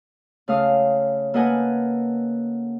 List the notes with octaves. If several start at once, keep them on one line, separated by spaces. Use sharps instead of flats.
C#3 A3 F5 D#6
A#3 A4 B4 D#5 F#5 G#5